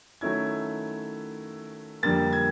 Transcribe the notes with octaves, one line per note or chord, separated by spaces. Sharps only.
D#3 F#3 A3 C#4 E4 G#6
F2 D3 G3 A#3 A6
G#6